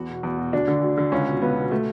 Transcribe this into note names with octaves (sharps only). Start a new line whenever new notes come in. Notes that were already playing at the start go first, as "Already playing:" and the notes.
Already playing: E2 F#4
B2
E2
B2
D2 D4
D3
D2
D3
C#2 C#4
B2
C#2 B3
B2
A3